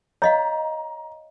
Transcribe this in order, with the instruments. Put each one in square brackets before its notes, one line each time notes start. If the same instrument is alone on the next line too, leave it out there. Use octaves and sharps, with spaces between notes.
[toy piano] C#5 D#5 F5 [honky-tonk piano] A#5